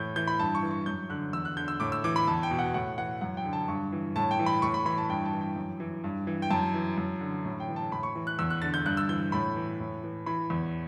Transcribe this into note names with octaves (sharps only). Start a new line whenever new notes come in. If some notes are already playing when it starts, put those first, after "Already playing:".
Already playing: A2 E3 G6
E3 G6
B5
G2 A5
C#6
E3
C#6
F#2 G6
D3 F#6
E2 E6
F#6
D3 G6
E6
A2 D6
E6
E3 D6
B5
E2 A5
G5
B2
F#5
A2 F#5
E3 F#5
F#2 F#5
G5
D3
A5
G2 C#6
E3
A2 A5
G5
E3
B5
A2 C#6
B5
E3 B5
A5
G2 G5
A5
E3
G5
F#2
E3
G2
E3
G5
F#2 A5
E3
F#2
D3
A2
G5
E3
A5
A2 B5
C#6
E3
F#6
E2 E6
F#6
D3 A6
G6
G2 F#6
E6
E3 G6
A2 B5
E3
A2
E3
E3 B5
E2